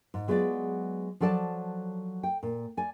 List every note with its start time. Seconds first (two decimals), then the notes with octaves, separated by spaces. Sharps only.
0.14 G#2
0.28 F#3 G#3 B3 F4 D5
1.20 F3 F#3 A4 D5 A5
2.23 G5
2.43 A#2
2.77 D5 G#5